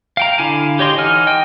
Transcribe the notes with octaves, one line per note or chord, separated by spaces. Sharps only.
F5 G5 A#5
D3 E4 F5 G#5
G4 C#5 D#5 C6
E3 D#4 F#5 G#5 F6
D#5 G5